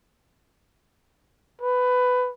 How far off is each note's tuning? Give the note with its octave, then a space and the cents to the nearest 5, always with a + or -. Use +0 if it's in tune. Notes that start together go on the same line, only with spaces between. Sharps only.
B4 +15